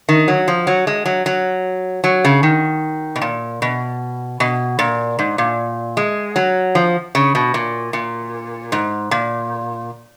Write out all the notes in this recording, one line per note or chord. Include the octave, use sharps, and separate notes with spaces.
D#3
F#3
F3
F#3
G#3
F#3
F#3
F#3
C#3
D#3
B2
A#2
B2
B2
A#2
G#2
A#2
G#3
F#3
F3
C#3
B2
A#2
A#2
G#2
A#2